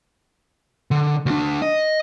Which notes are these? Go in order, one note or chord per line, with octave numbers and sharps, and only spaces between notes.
D3
D2 D4
D#5